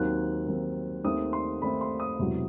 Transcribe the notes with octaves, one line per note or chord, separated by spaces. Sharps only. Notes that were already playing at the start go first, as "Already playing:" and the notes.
Already playing: D#2 D#3 F#3 C4 F#6
D#2 D#3 F#3 C4
D#2 D#3 A3 C4 D#6
C6
D#2 D#3 A3 C4 B5
C6
D#6
E1 E2 C3 F#3